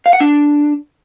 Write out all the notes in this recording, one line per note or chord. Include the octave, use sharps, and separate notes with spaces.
F5
F#5
D4